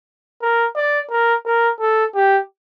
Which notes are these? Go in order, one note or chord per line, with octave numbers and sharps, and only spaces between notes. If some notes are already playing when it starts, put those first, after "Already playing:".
A#4
D5
A#4
A#4
A4
G4